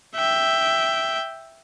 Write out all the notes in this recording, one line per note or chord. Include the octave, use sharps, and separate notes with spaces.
E5 G5